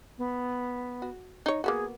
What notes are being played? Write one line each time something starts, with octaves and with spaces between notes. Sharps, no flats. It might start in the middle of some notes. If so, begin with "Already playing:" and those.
B3
F#4
D#4 C#5
A#3 B3 F#4 G#4